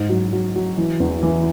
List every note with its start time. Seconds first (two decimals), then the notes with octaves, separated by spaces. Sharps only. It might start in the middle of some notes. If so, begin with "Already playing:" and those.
Already playing: G#2
0.09 F#3
0.33 F#3
0.56 F#3
0.78 E3
1.00 E2
1.23 E3